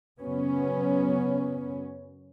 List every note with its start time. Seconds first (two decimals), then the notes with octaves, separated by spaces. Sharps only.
0.20 F#2 C#3 F#3 B3 C#4